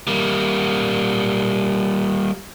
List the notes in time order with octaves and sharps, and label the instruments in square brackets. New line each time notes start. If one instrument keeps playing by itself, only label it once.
[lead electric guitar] G3 A#3